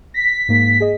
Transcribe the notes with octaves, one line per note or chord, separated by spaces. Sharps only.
A#6 B6
G#2 A#3
G#4 D#5